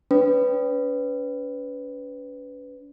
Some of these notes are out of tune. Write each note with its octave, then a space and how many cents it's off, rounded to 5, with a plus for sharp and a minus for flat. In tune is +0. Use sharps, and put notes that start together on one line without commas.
C#4 +45 B4 +15